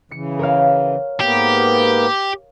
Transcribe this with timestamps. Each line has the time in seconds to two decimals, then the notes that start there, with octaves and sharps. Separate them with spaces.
0.11 C#3 E3 C#7
0.39 A#4 C#5 F5
1.20 G#2 A#3 B3 G4